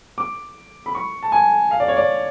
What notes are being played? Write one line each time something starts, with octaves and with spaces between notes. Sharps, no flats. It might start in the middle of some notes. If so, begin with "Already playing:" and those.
D6
B5
C#6
A5
G#5
F5
D5
C#5
D5